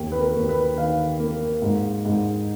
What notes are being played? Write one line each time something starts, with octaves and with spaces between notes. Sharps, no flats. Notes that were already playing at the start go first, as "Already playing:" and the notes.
Already playing: D#2
B4
A#4
D#2
B4
D#3 F5
A#3
G#2
G#2